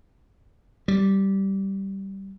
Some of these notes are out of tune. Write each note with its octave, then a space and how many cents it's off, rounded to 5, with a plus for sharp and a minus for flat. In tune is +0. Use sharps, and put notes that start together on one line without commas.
G3 -10